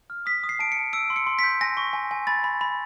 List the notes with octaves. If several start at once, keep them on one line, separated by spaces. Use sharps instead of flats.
F6
D#6 B6
D#6
C7
A5 D7
C#7
A5
E6 D7
C6
C#7
C6
B6
G6
G#5 A#6
C#6
G#5
G#5
B5 A6
B5
B5